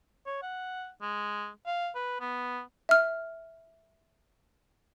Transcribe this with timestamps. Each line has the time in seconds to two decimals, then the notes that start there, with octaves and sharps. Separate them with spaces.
0.26 C#5
0.43 F#5
1.02 G#3
1.66 F5
1.95 B4
2.20 B3
2.89 E5 F6